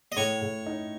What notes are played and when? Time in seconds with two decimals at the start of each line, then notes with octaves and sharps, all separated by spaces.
0.12 D#5
0.16 A2 C#5
0.41 A2
0.66 D#4